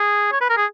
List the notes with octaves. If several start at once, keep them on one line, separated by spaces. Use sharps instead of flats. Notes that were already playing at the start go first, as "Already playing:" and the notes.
Already playing: G#4
C#5
B4
A#4
G#4